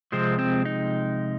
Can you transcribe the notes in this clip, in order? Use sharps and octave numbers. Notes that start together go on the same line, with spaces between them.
C3 F3 G#3 C4
C4
D#4